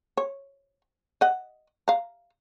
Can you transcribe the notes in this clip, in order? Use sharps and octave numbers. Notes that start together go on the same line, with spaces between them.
C#5
D#5 F#5
F5 A#5